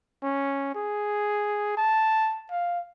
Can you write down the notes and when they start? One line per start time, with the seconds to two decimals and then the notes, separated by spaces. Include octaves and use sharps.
0.22 C#4
0.75 G#4
1.77 A5
2.51 F5